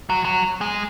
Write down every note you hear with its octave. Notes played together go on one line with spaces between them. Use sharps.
F#3
F#3
G#3